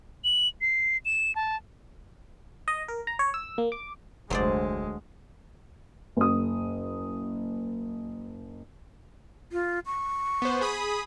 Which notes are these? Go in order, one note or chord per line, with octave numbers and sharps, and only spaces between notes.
F#7
C7
E7
A5
D#5
A#4
A#5
C#5
E6
A#3
D6
F1 D2 F#3 G#3 C5 D5
F#1 D#6
F4
C#6
B3 C5
G#4 B5 D#6